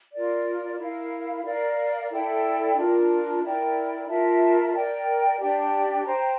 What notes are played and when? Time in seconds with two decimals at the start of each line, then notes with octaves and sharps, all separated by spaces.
0.14 F4 A#4 D5
0.79 E4 A#4 F5
1.44 A#4 D5 F5
2.10 E4 A4 D5 G5
2.76 D4 F4 A#4
3.42 E4 A#4 D5 G5
4.07 F4 A#4 E5 A5
4.73 A#4 D5 G5
5.39 D4 G4 D5 G5
6.04 C5 G5 A#5